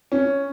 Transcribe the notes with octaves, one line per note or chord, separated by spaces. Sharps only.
C#4